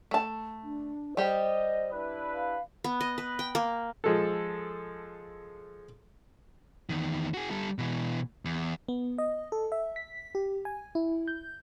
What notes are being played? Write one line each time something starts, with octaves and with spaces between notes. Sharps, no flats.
A3 A5
D4
G3 G4 C5 D#5
D4 E4 B4
F5
B3
D#5
B4
G5
A#3
F3 G#3 A4
E2 D#3
F#4 G#4
G3 A4
B2 E3
E2
B3
D#5
A4
E5
B6
G4
G#5
E4
G6